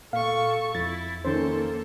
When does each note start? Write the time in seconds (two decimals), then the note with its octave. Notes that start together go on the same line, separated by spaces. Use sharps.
0.13 A#2 A4 F5 C#6
0.75 F2 E4 A6
1.25 F2 D#3 A#3 C#4 A4 C5